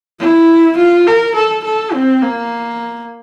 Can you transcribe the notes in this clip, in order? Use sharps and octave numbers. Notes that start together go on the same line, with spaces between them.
E4
F4
A#4
A4
A4
C4
A#3